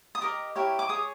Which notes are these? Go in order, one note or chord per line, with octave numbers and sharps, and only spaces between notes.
D#6
G4 A#4 D#5 D6
E4 G4 A#4 C#5
D6
G#4 C#5 D#6